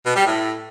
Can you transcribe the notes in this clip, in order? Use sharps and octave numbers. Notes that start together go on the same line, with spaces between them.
B2
G3
A2